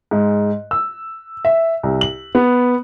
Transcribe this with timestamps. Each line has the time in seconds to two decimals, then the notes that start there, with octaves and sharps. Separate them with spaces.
0.11 G#2
0.71 E6
1.45 E5
1.83 C2
2.01 F#7
2.35 B3